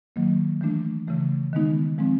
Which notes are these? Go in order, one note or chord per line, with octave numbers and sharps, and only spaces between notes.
D#3 F#3 A#3
E3 A3 D4
C#3 E3 A3
D#3 G#3 B3 D#4
F3 G#3 C4